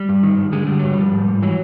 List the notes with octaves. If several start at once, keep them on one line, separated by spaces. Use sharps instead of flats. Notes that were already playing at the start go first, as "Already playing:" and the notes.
Already playing: G3
G2
D#3
G2
D3 G#3
D3 G3
G2 F#3
F3 G3
G#2
G#2
E3 F#3